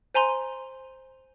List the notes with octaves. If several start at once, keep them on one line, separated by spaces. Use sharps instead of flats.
C5 G#5 A#5 C6